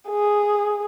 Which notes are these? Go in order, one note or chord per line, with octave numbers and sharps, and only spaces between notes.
G#4